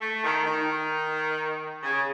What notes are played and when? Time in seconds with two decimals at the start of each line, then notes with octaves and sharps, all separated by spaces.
0.01 A3
0.24 D#3
0.46 D#3
1.83 C#3